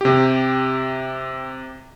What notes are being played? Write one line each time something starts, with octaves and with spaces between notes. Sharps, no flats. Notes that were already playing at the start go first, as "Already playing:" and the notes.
C3 G4